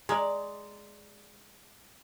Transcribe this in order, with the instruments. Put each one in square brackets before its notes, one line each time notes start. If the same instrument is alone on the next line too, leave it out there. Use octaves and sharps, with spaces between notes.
[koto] G#3 [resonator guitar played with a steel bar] D5 A#5